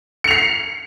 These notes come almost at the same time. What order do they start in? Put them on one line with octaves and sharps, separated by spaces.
C#7 F7 C7